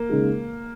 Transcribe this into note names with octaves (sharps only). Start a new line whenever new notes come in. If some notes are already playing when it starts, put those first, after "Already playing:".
Already playing: A#3
C#3 G#3 D#4 G#4